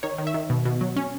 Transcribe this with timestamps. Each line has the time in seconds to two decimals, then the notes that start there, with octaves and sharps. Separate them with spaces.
0.03 D#3 C#5
0.18 D#3
0.27 E5
0.34 D#3
0.50 B2
0.65 B2
0.81 F#3
0.96 C#4